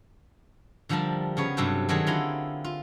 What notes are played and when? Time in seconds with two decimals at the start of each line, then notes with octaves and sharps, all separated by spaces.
0.89 D3 F3 G3 A#4 A5
1.37 C#3 B3 C#5
1.57 G2 C3 F#3 A4 G5
1.89 D#3 F#3 C4 G#4 A4
2.07 D3 E4 F4 F#5 A#5 C6
2.64 F4